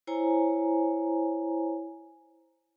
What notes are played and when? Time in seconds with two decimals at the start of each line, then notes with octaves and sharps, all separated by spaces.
0.07 E4 C5 C#5 G#5 A#5